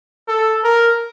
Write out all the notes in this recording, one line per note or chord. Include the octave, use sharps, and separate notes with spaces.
A4
A#4